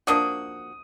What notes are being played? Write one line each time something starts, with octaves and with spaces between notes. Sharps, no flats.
F3 A#3 D4 F#4 D#6